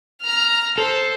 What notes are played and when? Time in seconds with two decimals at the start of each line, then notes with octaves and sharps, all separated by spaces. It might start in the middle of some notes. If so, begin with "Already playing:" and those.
0.21 A#5 F6
0.78 A4 C5